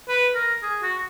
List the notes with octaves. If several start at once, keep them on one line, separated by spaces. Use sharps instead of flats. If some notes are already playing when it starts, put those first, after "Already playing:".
B4
A#4
G#4
F#4